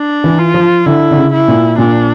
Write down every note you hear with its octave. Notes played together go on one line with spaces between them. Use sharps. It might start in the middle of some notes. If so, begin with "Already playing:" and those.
Already playing: D4
E3
F4
F3
D3 E4
D3
C#3
E4
A#2
A#2 D4